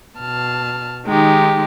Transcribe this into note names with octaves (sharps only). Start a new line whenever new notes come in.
B2 A5 F6
D#3 G#3 D#4 G4